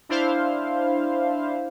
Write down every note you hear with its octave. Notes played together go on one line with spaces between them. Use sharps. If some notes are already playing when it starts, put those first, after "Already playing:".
D4 E4 C5 F5